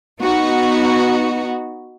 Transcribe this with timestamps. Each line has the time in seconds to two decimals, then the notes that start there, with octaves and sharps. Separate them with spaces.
0.19 B3 D#4 F#4